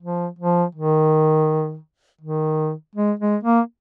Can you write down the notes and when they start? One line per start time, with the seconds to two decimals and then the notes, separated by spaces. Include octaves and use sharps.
0.02 F3
0.39 F3
0.75 D#3
2.21 D#3
2.96 G#3
3.19 G#3
3.43 A#3